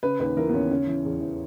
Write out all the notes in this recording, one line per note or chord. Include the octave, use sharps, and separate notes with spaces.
C#3 B4
D#2 B4
E3 A#4
B3
D#2 C#4
C#3 C#4
E3
E2
E3